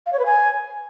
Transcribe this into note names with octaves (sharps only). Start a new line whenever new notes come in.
F5
C#5
B4
G#5